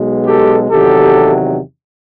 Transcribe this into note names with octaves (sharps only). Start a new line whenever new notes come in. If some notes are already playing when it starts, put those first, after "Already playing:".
Already playing: B1 B2 G#3
G4 A4
E2 C3 D#3 F#3 G4 A4